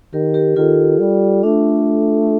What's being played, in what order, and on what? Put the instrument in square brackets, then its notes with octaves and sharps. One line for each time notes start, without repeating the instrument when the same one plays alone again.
[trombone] D#3 [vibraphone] G4 A#4
[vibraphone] G4 A#4
[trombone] D#3 [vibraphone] F4 A4
[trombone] G3
[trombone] A3 [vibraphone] D4